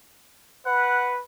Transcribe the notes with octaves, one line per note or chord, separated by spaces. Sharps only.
B4 F#5